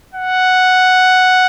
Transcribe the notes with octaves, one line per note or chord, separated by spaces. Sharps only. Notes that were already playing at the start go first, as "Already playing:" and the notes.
F#5